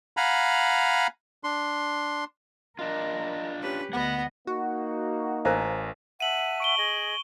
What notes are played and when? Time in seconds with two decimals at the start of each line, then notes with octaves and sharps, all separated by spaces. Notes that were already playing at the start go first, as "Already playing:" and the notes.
0.17 F5 F#5 G#5 A#5 B5
1.44 D4 C6
2.79 D4 F4 A#4 D#5
3.62 C#4 G4 B4
3.93 D2 B3 D#5 F#5 B5
4.47 A#3 D#4 F#4
5.45 A1 A#4 C5 F5 G#5 A#5
6.20 E5 F#5 A5 D#7 F#7
6.60 C#6 D7 G7
6.78 G#4 D#5